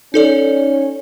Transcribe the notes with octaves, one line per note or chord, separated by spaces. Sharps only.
C#4 D#4 A4 D5